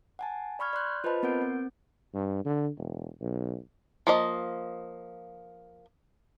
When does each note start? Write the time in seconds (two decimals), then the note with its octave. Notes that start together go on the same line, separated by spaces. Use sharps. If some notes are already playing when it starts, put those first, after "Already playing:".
0.19 F#5 G#5 A5
0.59 D5 B5 C#6 F6 G#6
0.73 D5 C6 F#6 G6
1.04 F4 B4 C5 D#5 A5 B5
1.23 B3 C4 A#4 F#5 G6 D7
1.42 C4
2.14 G2
2.45 D3
2.78 E1
3.21 B1
4.07 F3 A#3 D#5